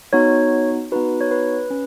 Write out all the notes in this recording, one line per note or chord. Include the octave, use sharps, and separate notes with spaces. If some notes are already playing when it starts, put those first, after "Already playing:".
B3 D#4 F#4 C#5
B3 D#4 F#4 B4
C#5
B4
C#4